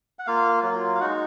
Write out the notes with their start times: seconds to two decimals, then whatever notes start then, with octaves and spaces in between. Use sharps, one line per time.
0.19 F#5
0.27 A#3 F4 F5
0.63 F#3 A#3 F4
0.95 F5
1.00 G#3 D#4 F#4 F#5